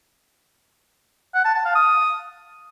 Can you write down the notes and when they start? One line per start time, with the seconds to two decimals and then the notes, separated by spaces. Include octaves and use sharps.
1.35 F#5
1.45 A5
1.55 A5
1.65 F5
1.75 D#6